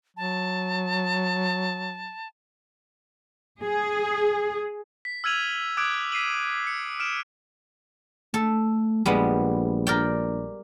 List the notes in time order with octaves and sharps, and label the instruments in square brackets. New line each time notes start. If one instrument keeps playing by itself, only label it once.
[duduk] F#3 [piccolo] A5
[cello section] G#4
[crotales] B6
E6 F6 G#6 D#7 F7 F#7
D6 D#6 F#6 G#6 D7
B6 C7 D#7 F#7
C#7
F6 D7 E7
[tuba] A3 [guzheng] A4
[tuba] A#1 [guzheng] G3 G#3 B3
[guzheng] A#4 D5 G5